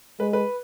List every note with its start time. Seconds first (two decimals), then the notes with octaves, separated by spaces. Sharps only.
0.19 G#3 B4
0.33 B4